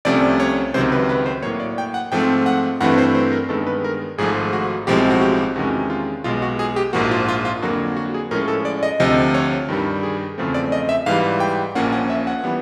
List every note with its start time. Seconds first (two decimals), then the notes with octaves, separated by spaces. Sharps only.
0.05 C2 C3 F3 A3 C#4 D5
0.40 C#5
0.74 C#2 C3 D#3 F#3 C5
0.92 B4
1.09 B4
1.26 C5
1.42 A2 F#3 A#3 C#5
1.60 D5
1.78 G5
1.94 F#5
2.12 G#2 F3 A3 C4 G5
2.46 F#5
2.81 G2 E3 A3 C4 F#5
2.98 C5
3.15 C5
3.32 A#4
3.49 G2 D#3 G#3 B3 A4
3.67 B4
3.84 A#4
4.18 G#1 G#2 F3 A3 G#4
4.53 F#4
4.87 B1 A2 F3 G#3 C4 G4
5.10 F#4
5.21 G4
5.56 E2 C3 D#3 G#3 C#4 F#4
5.90 F4
6.24 B1 B2 G#3 F4
6.42 F#4
6.59 G#4
6.76 G4
6.93 A#1 G#2 F3 A#3 F#4
7.11 F4
7.28 F4
7.45 F4
7.62 F2 D3 F#3 A#3 F#4
7.97 F#4
8.14 G#4
8.31 A2 F3 G#3 C#4 A#4
8.48 A4
8.65 D5
8.83 D#5
9.00 D2 C3 F3 D#5
9.34 C#5
9.68 G2 D#3 G3
10.03 G#4
10.38 E2 C#3 F3 A3 C4
10.54 D5
10.72 D#5
10.89 E5
11.06 G#2 E3 G3 F5
11.40 G5
11.75 A#1 A#2 F3 A#3 C#4 F#5
11.92 F#5
12.10 E5
12.27 F#5
12.44 E3 G3 B3